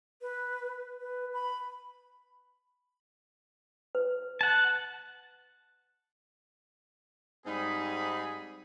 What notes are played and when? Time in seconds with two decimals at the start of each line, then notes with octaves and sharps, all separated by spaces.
0.21 B4
1.00 B4
1.33 B5
3.95 B4
4.41 F#5 A5
7.46 G#2 G3 C4 D#4 G#4 B5